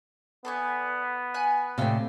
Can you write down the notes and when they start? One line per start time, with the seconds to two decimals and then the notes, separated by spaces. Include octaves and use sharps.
0.45 B3 A4 D5 G#5
1.34 G#5 B5 F#6
1.78 A2 C3 D5 F5 G5